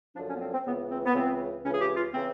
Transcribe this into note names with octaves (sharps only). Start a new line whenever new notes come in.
F#2 D3 F3 D4
C#4
B3
C4
C4
C#2 C#3 E3 B3
C4
B3
C#2 C#3 E3 C4
C#2 C#3 E3 C#4
G#4
G4
F4
C#3 E3 C4